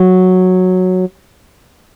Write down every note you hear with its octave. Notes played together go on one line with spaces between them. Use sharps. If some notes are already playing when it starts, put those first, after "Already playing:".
Already playing: F#3